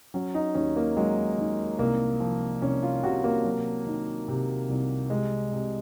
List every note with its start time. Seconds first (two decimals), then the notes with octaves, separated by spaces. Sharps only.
0.14 F#3 C#4
0.34 D#4
0.55 D#2 C#4
0.76 A#3
0.97 F#3 G#3
1.38 D#3
1.79 C2 A#3
2.20 F3
2.62 C2 C#4
2.83 F4
3.04 C3 F#4
3.24 A#3
3.45 F#3
3.87 D#3
4.28 C3
4.69 C2
5.10 C3 G#3
5.52 C3